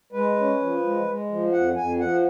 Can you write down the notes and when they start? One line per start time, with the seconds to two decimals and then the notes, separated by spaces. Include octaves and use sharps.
0.12 G#3 B4
0.36 C#4
0.60 F3
0.83 G#3
1.06 G#3
1.29 F3
1.53 F2 F#5
1.76 F2 G#5
1.99 F3 F#5